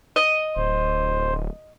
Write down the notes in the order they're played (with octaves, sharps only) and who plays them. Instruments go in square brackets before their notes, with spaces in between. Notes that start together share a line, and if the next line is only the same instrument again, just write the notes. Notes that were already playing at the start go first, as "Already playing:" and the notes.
[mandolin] D#5
[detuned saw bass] D1 [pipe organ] C5